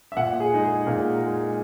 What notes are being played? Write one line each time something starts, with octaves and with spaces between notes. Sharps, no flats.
E5
A#2 F#5
G#4
G#3 D#4
G#4
A#2 A#4
G#3 D#4